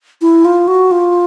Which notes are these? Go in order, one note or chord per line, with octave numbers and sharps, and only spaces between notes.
E4
F4
F#4
F4